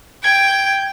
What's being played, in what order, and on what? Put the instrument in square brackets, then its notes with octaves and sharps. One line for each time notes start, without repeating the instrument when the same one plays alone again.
[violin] G5 [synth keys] G#6